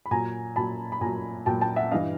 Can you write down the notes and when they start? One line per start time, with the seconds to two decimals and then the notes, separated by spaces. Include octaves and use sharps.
0.06 B5
0.11 A#2 F#3 G#5 A#5
0.56 A#2 F#3 A5 B5
0.92 B5
1.01 A#2 F#3 G#5 A#5
1.46 A#2 F#3 G5 A5
1.61 G5 A5
1.76 E5 F#5
1.91 G2 E3 D#5 F5